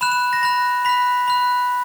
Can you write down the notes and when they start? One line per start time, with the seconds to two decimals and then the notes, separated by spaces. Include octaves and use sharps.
0.01 B5 F#6 E7
0.12 E7
0.33 A#6
0.43 B5 F#6 A#6
0.85 B5 F#6 B6
1.28 B5 F#6